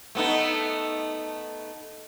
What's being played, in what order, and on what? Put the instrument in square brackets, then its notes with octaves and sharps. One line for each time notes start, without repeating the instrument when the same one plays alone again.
[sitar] A3 B3 D#4